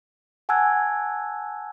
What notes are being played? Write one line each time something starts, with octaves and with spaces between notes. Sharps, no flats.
F#5 G#5 A5 E6 F#6 G#6